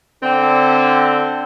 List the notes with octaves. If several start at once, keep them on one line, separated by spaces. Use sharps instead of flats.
D3 C4